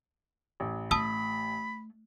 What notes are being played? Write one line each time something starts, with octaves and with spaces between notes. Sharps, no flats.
A1
A3 A5 B5 D#6 E6